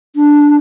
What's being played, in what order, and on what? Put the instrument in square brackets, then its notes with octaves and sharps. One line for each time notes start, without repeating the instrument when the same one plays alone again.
[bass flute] D4